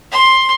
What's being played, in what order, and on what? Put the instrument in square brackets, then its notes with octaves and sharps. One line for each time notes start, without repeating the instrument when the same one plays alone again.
[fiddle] C6